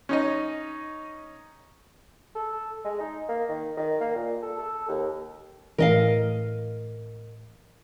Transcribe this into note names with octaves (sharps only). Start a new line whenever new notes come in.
C#4 D#4 D#5
A4
G#3
D#4
A#3
D#3
D#3
A#3
A#2
A4
A4
D#2
A2 E3 A#4 D#5 F5